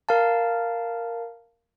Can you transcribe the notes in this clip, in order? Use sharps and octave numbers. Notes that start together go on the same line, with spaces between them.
A#4 F5 A5